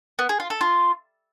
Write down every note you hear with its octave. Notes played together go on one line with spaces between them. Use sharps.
B3
G#4
F4
A4
F4